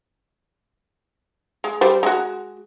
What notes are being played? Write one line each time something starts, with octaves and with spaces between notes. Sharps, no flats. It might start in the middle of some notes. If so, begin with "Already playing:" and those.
G#3
G3 C5
G#3 F#4